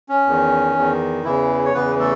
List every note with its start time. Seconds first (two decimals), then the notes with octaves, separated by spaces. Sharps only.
0.09 C#4
0.27 E2 D#3
0.75 E2 D#3
1.24 E2 C#3 E3 E4
1.65 C#5
1.74 E2 C#3 E3 B3 B4
1.99 A3 A4